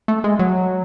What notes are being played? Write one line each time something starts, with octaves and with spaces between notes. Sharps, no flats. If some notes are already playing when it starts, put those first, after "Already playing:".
A3
G#3
F#3